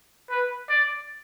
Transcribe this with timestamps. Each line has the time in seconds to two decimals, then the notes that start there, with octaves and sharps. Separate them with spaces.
0.30 B4
0.69 D5